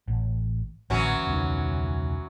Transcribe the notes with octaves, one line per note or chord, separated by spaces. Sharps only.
A1
A1 D2 E3 F#3 C#4
E1 C#2 D#3